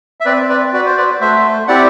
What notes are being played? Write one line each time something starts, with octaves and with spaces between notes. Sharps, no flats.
E5
C4 B4 D5
B4 D5
F#4 B4 D5
C5
B4 D5
A3 C5 E5
C4 E4 G4 D5 F#5